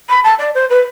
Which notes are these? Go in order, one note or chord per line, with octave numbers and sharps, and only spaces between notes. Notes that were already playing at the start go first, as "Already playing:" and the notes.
B5
A5
D5
C5
B4